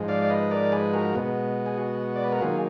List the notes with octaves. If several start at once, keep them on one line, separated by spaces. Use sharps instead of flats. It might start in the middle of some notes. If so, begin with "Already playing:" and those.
Already playing: G#2 F3 G#3
D5 F5
D5
B4 D#5
A#4 D5
G#4 B4
F#4 A#4
B2 G#3 B3
G#4
F#4
D5
B4
A#4
D#3 F#3 A#3 F4 G#4